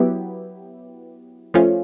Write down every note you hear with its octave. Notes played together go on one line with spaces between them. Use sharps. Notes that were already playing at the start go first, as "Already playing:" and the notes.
Already playing: F#3 B3 E4 G4
F3 A3 C#4 F4